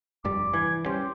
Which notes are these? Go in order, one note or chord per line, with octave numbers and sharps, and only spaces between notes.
F1 G2 G3 D6
E3 G#5
G3 C#4 C5